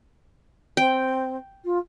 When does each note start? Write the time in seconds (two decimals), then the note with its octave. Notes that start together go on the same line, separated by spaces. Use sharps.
0.77 C4 G5
1.64 F4